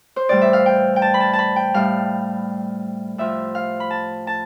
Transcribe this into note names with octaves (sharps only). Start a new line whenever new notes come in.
C5
A2 E3 G3 D5
E5
F5
G5
G5
A5
B5
A5
A5
B5
G5
A2 G3 F5
A2 F3 E5
F5
B5
A5
A5